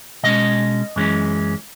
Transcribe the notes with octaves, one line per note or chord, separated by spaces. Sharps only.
B2 G#3 C#4 D#5
F#2 E3 G#3 C#4